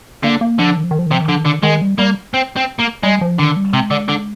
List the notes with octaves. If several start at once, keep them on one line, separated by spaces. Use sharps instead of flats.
D3 A#3
A#3
D3 F3
D#3
F3
D#3
F3
D#3
C3 F3
D#3
D3 F3
D#3
D3
D#3 G#3
G3
G3 A#3
C4
C4
A#3
G3 G#3
F3
D3 D#3
G3
C3 G#3
D3
D3